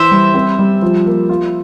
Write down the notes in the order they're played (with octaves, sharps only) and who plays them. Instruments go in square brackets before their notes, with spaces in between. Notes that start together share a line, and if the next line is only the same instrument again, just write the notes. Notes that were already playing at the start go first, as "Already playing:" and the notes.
Already playing: [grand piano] E3 [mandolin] C5 E5
[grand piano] G3
C4
G3
F3
A#3
F4